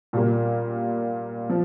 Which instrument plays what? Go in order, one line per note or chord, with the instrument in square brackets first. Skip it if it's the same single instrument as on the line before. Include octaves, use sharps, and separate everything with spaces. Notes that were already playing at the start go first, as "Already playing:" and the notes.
[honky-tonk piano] A#2 G3 A#3
F3